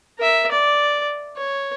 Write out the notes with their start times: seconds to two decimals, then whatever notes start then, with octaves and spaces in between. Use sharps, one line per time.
0.18 A#4 E5
0.51 D5
1.37 C#5